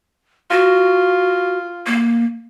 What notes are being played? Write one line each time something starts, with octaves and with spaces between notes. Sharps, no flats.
F4 F#4
A#3